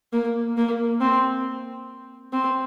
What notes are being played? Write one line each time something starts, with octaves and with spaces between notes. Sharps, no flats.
A#3
A#3
C4
C4